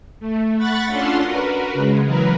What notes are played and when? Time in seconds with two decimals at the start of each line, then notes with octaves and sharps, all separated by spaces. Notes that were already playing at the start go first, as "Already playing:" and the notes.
0.20 A3
0.57 F#5 B5 C#6 F#6 A6
0.87 C#4 D4 F4 A4 F#5 C6
1.22 F#4 A#4 B4
1.74 C#3 G#3
2.06 E3 F#3 A#4 B4